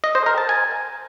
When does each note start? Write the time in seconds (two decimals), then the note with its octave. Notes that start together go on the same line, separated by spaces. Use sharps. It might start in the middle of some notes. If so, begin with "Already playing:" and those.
0.04 D#5
0.15 C5
0.26 A#4
0.38 A5
0.49 G#5